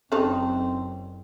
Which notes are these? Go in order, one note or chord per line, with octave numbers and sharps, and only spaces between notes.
F#1 C4 C#4 D#4 A4 A5